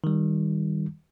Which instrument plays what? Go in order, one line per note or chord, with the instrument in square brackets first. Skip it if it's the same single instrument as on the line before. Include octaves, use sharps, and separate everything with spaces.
[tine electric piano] D#3 G3